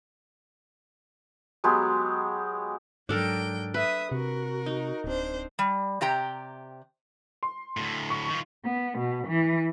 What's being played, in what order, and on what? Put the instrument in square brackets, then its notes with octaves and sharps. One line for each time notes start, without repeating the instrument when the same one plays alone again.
[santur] F#3 G#3 B3 G4
[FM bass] G#2 [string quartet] F#3 G5 [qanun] D4 A4 A#4
[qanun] B4 [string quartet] E5 D#6
[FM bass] C3 [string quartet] F#4 A#4
[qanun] D#4
[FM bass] D1 [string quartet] C4 D4 C5
[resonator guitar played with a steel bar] G3
C3 G4 G5 A#5
[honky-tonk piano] C6
[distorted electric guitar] D2 A2
[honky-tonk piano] C#6
[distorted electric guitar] D#3 F4
[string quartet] B3
B2
E3